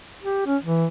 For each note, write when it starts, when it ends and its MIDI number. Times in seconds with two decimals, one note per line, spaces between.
0.22 0.41 67
0.46 0.57 61
0.63 0.86 52